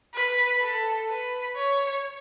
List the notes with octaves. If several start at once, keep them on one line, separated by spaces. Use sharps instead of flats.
B4
A4
B4
C#5